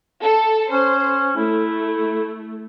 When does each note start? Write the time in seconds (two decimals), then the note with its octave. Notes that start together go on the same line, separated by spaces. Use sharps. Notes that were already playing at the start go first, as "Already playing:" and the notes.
0.22 A4
0.71 C#4 C5
1.36 A3 E4